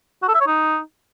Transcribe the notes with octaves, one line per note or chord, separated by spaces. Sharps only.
F#4
A4
E5
C#5
D#4